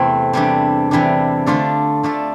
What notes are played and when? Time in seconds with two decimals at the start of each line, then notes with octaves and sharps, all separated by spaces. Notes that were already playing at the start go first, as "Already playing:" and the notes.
Already playing: E2 C3 E3 A3 C4
0.33 C3 E3 G3 D4
0.91 C3 E3 G3 D4
1.46 D3 A3 D4 F4 A4
2.03 D3 A3 D4 F4 A4